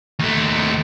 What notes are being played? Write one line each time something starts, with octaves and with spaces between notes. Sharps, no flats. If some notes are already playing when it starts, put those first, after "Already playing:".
D#2 A3